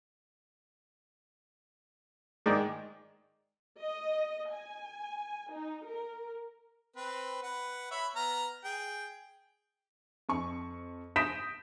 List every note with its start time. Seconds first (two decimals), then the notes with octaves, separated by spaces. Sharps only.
2.46 G#2 D#3 G#4 D5
3.80 D#5
4.52 G#5
5.51 D#4
5.85 A#4
6.96 C4 B4
7.43 B4 F#5
7.91 C#5 E5 B5
8.16 B3 A#5 F6
8.64 G#4 G5
10.29 F2 C#6
11.16 D#6 G6 A#6 B6 D7 E7